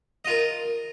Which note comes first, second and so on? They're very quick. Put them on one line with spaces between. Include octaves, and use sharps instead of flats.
D#5 F4 A#4